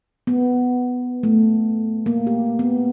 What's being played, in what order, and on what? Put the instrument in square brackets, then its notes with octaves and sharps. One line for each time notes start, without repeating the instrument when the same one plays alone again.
[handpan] B3
A3
A#3
G4
B3